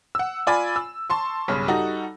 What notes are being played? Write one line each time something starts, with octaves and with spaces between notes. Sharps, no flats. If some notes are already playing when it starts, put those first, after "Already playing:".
F#5 E6
F4 D5 G#5 B5
E6
A5 C6 C#6
B1 G2 C#3
G3 D#4 F#4 A4